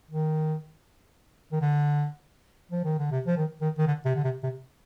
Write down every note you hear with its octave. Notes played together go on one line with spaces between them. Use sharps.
D#3
D#3
D3
F3
D#3
D3
C3
F3
D#3
D#3
D#3
D3
C3
D3
C3
C3